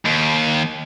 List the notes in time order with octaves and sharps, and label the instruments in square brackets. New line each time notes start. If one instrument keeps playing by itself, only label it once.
[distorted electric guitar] D#2